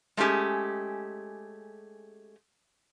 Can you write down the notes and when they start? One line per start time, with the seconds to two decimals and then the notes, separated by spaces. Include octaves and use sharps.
0.17 G#3 A3 C#4 G4 G#4